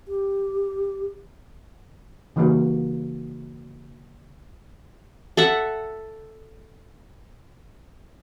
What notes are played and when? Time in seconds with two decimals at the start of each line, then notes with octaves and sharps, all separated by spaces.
0.08 G4
2.36 C#3 E3 G3 A#3 D#4 F#4
5.37 A4 E5 F#5